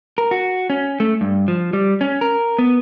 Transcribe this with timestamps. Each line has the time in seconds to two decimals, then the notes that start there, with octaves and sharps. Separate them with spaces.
0.18 A#4
0.31 F#4
0.70 C#4
1.00 A3
1.21 G2
1.48 F3
1.73 G3
2.01 C#4
2.21 A#4
2.58 B3